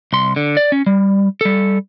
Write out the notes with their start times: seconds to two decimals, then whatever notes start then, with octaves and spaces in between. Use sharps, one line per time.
0.13 C2 C6
0.36 D3
0.57 D5
0.72 C#4
0.86 G3
1.41 G3 A4